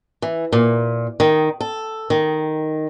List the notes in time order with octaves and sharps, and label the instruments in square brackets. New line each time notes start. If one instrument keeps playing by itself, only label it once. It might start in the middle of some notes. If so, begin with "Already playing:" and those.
[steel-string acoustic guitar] E3
A#2
D#3
A4
D#3